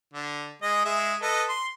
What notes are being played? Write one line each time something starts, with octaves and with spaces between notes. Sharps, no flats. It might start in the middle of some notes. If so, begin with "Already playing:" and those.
D3
G#3 D#5
G#3 E5
A4 B4 D#5
C6